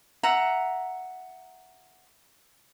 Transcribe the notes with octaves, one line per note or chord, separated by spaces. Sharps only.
E5 F#5 A#5